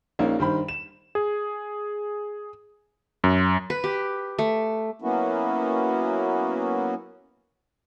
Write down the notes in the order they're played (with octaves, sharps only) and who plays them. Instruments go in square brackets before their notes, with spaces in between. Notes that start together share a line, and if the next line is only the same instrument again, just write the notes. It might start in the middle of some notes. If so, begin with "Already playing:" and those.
[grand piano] A#1 A#3 C#4 D#4
G2 D#3 C5 B5
E7
[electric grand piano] G#4
F#2
[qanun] B4
G4
A3
[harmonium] F#3 A#3 B3 C#4 E4 F#4